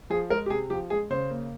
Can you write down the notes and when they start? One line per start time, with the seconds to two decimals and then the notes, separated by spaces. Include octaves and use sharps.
0.10 F3 G#4
0.30 G#3 A#4
0.46 G4
0.50 C3 G#4
0.70 F3 G4
0.90 G#3 G#4
1.10 C#3 C5
1.30 A#3